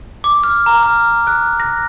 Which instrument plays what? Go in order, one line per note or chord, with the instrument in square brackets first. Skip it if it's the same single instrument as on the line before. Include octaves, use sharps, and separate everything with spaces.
[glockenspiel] D6
F6
A#5
F6
F#6
A#6